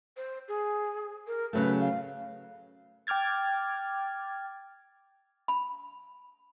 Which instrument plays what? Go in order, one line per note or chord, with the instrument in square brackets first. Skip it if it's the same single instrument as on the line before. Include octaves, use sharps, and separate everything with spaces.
[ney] C5
G#4
A#4
[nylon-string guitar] C#3 F#3 A3 [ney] B4
[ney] F5
[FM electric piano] G5 D6 F6 G#6 A6
[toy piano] B5